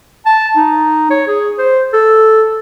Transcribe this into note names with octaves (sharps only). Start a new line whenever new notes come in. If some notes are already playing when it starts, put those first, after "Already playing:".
A5
D#4
C#5
G#4
C5
A4